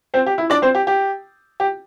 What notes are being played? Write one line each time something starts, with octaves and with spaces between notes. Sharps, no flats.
C4 C5
G4
E4
D4 D5
C4 C5
G4
G4
G4